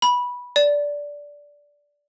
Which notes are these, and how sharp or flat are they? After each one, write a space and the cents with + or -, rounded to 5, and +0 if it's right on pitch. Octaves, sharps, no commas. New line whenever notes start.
B5 -10
D5 -10